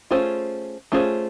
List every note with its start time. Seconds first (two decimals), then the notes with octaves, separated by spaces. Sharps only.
0.11 A3 C#4 F4 G#4 C5
0.92 A3 C#4 F4 G#4 C5